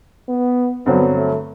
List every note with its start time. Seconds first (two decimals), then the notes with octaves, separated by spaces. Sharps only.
0.28 B3
0.86 G2 D3 F#3 B3 C4
1.16 A3